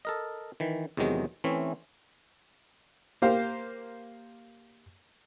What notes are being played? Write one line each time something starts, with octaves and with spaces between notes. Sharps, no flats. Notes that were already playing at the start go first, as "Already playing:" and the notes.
A4 A#4 D#5
D#3 E3
E2 C3 D#3 F#3 G#3
E3 A3 C4 C#4
A#3 G4 C5 F5